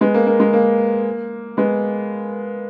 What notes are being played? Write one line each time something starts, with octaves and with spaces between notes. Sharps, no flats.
G#3 B3
A#3
A#3
G#3
A#3
G#3 B3